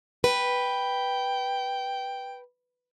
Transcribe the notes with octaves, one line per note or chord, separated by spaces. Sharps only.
B4 G5